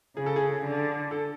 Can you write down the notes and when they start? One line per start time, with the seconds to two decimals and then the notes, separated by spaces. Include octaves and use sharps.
0.17 C#3 G#4
0.26 A4
0.36 G#4
0.65 D3
1.11 A4